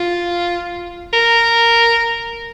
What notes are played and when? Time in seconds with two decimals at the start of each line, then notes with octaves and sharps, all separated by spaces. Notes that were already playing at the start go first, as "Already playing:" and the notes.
Already playing: F4
1.13 A#4